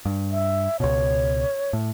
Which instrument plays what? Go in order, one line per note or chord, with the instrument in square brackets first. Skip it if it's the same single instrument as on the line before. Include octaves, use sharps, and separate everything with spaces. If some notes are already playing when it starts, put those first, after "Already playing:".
[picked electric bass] G2
[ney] E5
[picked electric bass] C#2 B2 [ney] C#5
[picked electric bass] A2